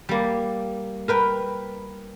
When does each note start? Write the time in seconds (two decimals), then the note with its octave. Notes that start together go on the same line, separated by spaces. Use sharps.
0.09 G3 A#3
1.08 A#4 B4 G5